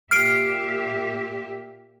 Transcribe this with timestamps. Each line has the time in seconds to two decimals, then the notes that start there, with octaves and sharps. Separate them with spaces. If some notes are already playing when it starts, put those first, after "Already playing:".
0.11 A#2 G4 E5 F6 C7 D7